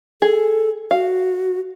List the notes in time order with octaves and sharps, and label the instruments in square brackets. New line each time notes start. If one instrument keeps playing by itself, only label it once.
[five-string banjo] G#4 [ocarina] A4
[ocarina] F#4 [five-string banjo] F5